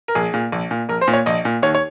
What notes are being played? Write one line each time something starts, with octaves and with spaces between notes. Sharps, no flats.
A#4
A#1 G#4
A#2
A#1
A#2
A#1 A#4
C5
A#2
C#5
A#1 D#5
A#2
D#2 C#5
C#5